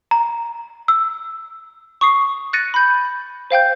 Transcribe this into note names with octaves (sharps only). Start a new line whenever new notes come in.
A#5
E6
C#6 D#6 C7
F#6 A6 A#6 C#7 D#7
B5 G6
C5 F5 G5 G6